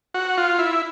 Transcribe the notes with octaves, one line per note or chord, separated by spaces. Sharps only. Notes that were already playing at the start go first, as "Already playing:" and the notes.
F#4
F4
E4